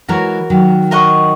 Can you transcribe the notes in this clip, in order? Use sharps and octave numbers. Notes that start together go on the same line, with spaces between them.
E3 G#3 F#4 A#4 C#5
D#3 F#3
A#4 D#5 F#5 C#6